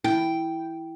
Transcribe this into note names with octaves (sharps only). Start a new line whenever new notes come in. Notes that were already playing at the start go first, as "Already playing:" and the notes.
E4 G5